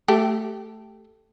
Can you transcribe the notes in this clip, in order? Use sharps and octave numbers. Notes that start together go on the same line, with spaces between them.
A3 G4